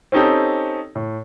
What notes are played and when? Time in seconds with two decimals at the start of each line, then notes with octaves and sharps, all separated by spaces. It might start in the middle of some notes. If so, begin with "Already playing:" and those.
0.12 C4 C#4 D#4 G4 A4
0.95 A2